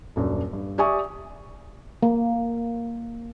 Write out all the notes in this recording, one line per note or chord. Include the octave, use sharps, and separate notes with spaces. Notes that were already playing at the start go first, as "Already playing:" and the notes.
D#1 F#2 D4
G2
G4 D5 E5 G#5 C#6 D#6
A#3